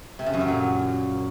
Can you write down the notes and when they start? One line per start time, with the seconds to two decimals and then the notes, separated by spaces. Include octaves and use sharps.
0.19 C3
0.26 C#3
0.34 F#2
0.41 F#3
0.48 A#2